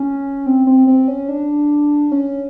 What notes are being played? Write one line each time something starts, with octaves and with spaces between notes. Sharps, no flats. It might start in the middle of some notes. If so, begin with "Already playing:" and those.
Already playing: C#4
C4
C4
C4
C#4
D4
C#4